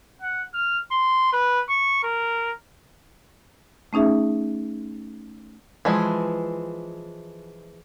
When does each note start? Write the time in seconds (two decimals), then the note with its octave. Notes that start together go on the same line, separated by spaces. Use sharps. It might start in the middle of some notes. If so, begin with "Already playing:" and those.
0.22 F#5
0.54 F6
0.91 C6
1.33 B4
1.69 C#6
2.03 A#4
3.93 A3 C#4 D#4 G#4 E5
5.85 E3 F3 G#3